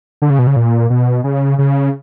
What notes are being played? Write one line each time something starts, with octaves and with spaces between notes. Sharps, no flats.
D3
C#3
B2
C#3
A#2
B2
C#3
C#3